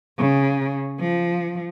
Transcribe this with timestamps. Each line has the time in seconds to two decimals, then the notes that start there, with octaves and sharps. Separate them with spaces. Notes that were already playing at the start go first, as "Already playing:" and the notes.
0.18 C#3
1.00 F3